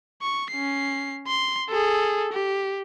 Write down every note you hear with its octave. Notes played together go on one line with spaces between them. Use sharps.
C#6
C#4 C7
C6
G#4 A4
G4